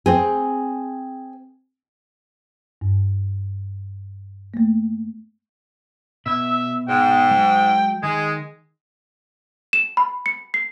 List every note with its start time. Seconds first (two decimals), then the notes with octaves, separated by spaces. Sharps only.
0.06 C4 G#4
2.81 G2
4.54 A3 A#3
6.26 B2 E5
6.88 G#2 G5
7.31 F#3 G#3
8.03 D#3 G#3 G#4
9.73 E7
9.97 B5
10.26 C#7
10.54 C7